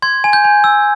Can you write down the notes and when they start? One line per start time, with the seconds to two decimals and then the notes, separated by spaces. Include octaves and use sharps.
0.02 C6 G#6
0.24 G#5
0.33 G6
0.44 G#5
0.64 E6